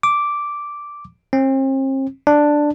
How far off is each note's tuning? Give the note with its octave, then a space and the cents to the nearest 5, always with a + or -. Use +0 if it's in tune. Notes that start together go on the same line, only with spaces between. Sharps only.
D6 -5
C4 +40
D4 +5